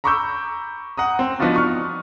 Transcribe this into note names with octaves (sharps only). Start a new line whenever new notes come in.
A#5 B5 C#6 D6 E6 G6
F#5 A#5 D#6
C4
F3 B3 D4 D#4 F4 F#4
C#6 F6